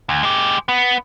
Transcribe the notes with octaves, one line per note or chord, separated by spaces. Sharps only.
D2
G#3 G4
B3